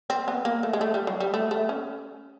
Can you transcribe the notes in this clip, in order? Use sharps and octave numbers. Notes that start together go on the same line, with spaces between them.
C4
B3
A#3
A3
G#3
A3
G3
F#3
G3
A3
A3
C#4